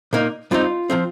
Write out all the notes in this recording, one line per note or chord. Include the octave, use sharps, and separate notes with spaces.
A#2 A#3 D#4
G2 G3 C4 D#4 F4
A#2 F3 C4